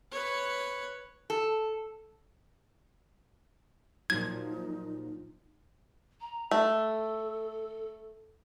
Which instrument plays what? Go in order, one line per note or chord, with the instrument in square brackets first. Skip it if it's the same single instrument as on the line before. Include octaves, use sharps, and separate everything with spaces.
[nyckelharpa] B4 C#5
[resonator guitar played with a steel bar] A4
[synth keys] A#2 F3 F#3 [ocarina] D#4 [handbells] G#6
[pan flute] A#5
[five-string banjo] A3 [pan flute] A4